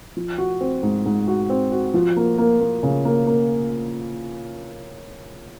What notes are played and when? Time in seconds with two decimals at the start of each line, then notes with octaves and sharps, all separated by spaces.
0.17 F3
0.38 F#4
0.61 C4
0.83 G#2
1.06 G#2
1.28 F#4
1.50 C4
1.72 F#4
1.94 F3
2.17 A#3
2.38 A#3
2.60 A#3
2.83 C#3
3.05 A#3
3.27 A#3